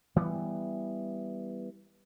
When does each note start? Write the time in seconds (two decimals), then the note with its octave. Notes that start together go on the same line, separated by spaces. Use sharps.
0.16 E3 G3 B3